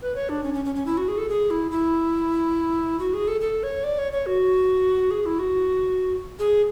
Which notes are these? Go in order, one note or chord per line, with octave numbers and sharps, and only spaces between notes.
B4
C#5
D4
C#4
C#4
C#4
C#4
E4
F#4
G#4
A4
G#4
E4
E4
F#4
G#4
A4
A4
C#5
D5
C#5
C#5
F#4
G#4
E4
F#4
G#4